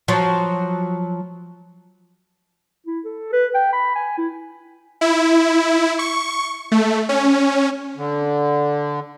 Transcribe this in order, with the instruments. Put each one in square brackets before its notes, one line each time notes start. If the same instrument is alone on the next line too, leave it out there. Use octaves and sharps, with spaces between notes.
[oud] F3 F#3
[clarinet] E4
A4
B4
G5
B5
G#5
E4
[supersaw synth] E4
C#6
A3
C#4
[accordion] D3